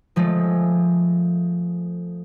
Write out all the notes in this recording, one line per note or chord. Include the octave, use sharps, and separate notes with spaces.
F3 G#3 A3